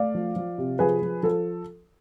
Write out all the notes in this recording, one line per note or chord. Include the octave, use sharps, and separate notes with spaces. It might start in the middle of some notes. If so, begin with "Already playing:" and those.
Already playing: A3 D5 F5
F3
F3
C3
F3 G#4 B4
F3
F3 A4